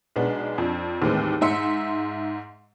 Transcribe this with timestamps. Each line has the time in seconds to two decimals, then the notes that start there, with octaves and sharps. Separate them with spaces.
0.16 B1 G#3 B3 D4
0.58 F2 D4
1.02 D#2 A2 E3 G#3 C4
1.41 G#2 E5 C6 C#7